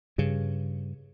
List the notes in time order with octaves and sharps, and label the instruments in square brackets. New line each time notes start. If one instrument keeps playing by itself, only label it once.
[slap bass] G2 C#3